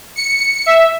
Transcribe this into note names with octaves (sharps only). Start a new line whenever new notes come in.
C#7
E5